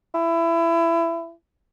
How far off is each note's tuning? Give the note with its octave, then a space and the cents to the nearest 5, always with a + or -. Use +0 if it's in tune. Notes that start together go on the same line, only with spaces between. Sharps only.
E4 +20